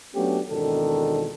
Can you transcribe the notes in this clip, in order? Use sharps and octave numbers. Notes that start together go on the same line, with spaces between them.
F#3 A3 B3 C#4 D4 G4
G#1 E2 B2 D#3 D4 A4